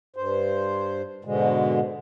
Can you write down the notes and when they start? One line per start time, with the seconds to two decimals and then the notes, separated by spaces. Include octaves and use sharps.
0.16 G2 C5
1.25 G#2 B2 D3 G#3